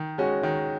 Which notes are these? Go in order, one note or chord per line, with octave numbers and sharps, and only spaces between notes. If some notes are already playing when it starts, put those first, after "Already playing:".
Already playing: D#3
G#3 C#4 F#4
D#3